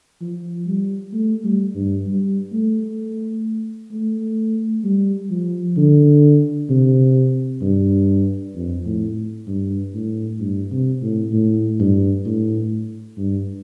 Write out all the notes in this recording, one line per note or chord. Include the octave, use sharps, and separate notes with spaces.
F3
G3
A3
G3
G2
G3
A3
A3
G3
F3
D3
C3
G2
F2
A2
G2
A2
G2
C3
A2
A2
G2
A2
G2